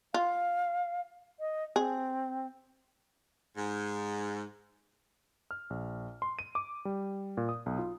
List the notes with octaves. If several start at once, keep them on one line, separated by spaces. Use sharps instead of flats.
F4 F5
D#5
C4 G#4
G#2
F6
A#1
C6
D#7
D6
G3
A#2
D#6
B1
F4